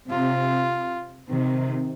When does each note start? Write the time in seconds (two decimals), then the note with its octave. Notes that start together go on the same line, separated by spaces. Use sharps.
0.09 C3 F4
1.29 C3 D#3